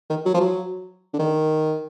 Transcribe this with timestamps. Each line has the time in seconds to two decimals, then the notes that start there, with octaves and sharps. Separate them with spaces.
0.10 D#3
0.26 F#3
0.34 F3
0.41 F#3
1.13 D3
1.19 D#3